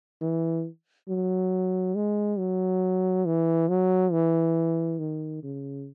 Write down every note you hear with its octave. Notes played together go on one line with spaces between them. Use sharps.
E3
F#3
G#3
F#3
E3
F#3
E3
D#3
C#3